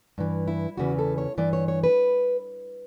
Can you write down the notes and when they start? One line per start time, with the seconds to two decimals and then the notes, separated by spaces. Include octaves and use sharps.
0.18 G2 E3
0.48 E4
0.77 E2 C#3 E3 F#4
0.99 A4
1.18 C#5
1.38 G2 E3 D5
1.53 C#5
1.68 C#5
1.84 B4